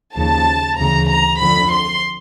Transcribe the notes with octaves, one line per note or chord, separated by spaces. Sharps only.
D#2 C#3 F3 A5
D2 C#3 E3 A#5
A#5
F2 D3 F3 B5
C6